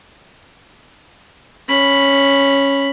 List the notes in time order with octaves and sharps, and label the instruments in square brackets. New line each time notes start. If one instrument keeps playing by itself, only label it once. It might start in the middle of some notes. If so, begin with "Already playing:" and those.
[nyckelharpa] C#4 B5